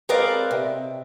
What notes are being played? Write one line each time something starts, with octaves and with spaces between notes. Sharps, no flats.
G#3 C4 A#4 B4 D5 F5
C3